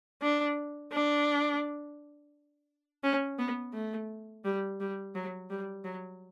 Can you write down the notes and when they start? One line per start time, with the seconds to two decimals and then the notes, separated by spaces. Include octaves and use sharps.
0.22 D4
0.92 D4
3.04 C#4
3.39 B3
3.73 A3
4.45 G3
4.80 G3
5.15 F#3
5.50 G3
5.85 F#3